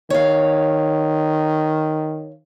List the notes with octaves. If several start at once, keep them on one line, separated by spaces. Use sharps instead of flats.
D#3 C#5 F5